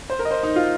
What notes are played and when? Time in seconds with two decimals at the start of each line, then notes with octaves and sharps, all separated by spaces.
0.10 C5
0.19 A#4
0.25 D#5
0.31 C5
0.43 D#4
0.56 F4